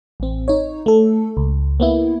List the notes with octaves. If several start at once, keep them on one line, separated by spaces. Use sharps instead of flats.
A1 C4
D#4 C#5
A3 A4
C#2
A#3 B3 E4